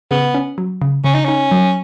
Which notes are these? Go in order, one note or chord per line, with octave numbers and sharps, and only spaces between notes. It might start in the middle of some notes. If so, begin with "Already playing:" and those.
C#3 B3
C#4
F#3
C#3
C#3 C#4
D#4
C#4 D#4
F#3